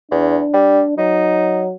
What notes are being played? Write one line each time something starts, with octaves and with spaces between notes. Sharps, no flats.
E2 D4
G3
F#3 D#4